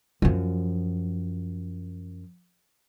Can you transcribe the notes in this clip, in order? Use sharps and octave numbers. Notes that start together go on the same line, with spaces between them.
F#2 F3